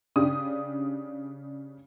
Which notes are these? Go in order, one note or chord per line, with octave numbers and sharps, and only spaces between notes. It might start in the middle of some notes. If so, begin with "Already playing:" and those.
C#3 D4 G4 D#6